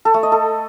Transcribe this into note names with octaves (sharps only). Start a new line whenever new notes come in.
A4
A3
D#5
A4